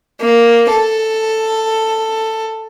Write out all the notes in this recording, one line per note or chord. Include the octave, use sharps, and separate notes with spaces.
A#3
A4